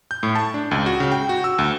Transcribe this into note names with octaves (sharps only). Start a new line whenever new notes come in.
G6
A2
A5
D4
C#2
F#4
C#3
G5
F#4
E6
D2